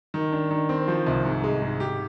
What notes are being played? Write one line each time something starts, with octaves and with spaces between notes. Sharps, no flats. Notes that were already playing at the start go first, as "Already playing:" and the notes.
D#3
D4
D#3
C4
F3
C2
G#2
G#3
G#2
G4